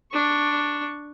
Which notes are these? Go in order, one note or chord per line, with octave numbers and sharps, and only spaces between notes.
D4 C#6